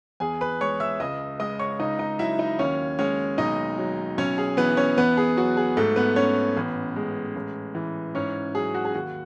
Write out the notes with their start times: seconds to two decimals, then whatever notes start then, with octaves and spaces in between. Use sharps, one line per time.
0.20 E2 G#4 G#5
0.41 B4 B5
0.61 G#3 C#5 C#6
0.80 E5 E6
1.00 C#2 D#5 D#6
1.40 G#3 D#5 D#6
1.59 C#5 C#6
1.80 C#2 D#4 D#5
1.99 D#4 D#5
2.19 F#3 E4 E5
2.39 D#4 D#5
2.59 D#2 C#4 C#5
2.99 G#3 C#4 C#5
3.38 B1 D#4 D#5
3.78 F#3
4.17 B1 C#4 C#5
4.38 G#4
4.57 E3 B3 B4
4.77 C#4 C#5
4.97 E2 B3 B4
5.17 G#4
5.37 F#3 F#4
5.57 G#4
5.77 G#2 A3 A4
5.96 B3 B4
6.16 B3 C#4 C#5
6.57 A1
6.96 G#3
7.36 A1
7.75 E3
8.15 G#2 C#4 C#5
8.55 F#3 G#4
8.74 F#4
8.85 G#4
8.94 D#2 F#4